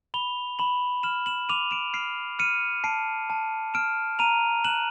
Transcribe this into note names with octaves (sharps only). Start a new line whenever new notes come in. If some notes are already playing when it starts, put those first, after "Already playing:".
B5 F7 G7
B5 E7 F#7
F6 E7 F#7
E7 F#7
D6 D#7 F7
D7 E7
F6 C7 D7
F6 C#7 D#7
A5 C7 D7
A5
F6 D7 E7
A#5 D#7 F7
F#6 E7 F#7